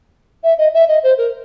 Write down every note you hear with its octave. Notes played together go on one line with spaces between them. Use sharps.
E5
D#5
E5
D#5
C5
A#4